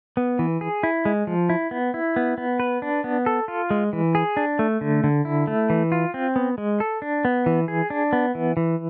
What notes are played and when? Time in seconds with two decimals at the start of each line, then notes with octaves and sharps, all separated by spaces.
0.17 B3
0.39 E3
0.61 G#4
0.83 E4
1.05 G#3
1.27 F3
1.49 E4
1.71 B3
1.94 E4
2.16 B3
2.38 B3
2.60 B4
2.82 D4
3.04 B3
3.26 A4
3.48 F4
3.70 G#3
3.93 E3
4.15 G#4
4.37 D4
4.59 A3
4.81 D3
5.04 D3
5.25 E4
5.47 A3
5.70 E3
5.92 F4
6.14 C4
6.36 B3
6.58 G#3
6.80 A4
7.02 D4
7.25 B3
7.46 E3
7.68 G#4
7.90 D4
8.13 B3
8.35 E3
8.57 E3